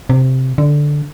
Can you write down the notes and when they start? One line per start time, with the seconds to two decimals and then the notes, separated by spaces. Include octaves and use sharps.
0.10 C3
0.58 D3